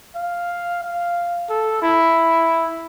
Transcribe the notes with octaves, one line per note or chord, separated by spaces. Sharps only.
F5
F5
A4
E4